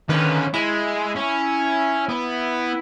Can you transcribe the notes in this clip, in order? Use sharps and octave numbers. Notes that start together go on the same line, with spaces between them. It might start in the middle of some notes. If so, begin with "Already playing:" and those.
D3 D#3 C#4 B4
G#3 E4
C#4
B3